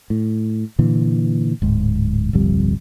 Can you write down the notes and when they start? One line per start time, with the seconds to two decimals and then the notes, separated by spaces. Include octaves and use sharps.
0.10 A2
0.79 A#2 D3 E3
1.62 D1 G#2
2.33 D1 G1 F2 G3